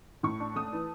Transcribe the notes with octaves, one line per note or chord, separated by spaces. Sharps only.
A2 C#6
D4
A3 D#6
E3